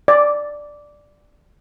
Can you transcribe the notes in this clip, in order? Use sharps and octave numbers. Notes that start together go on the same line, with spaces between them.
D5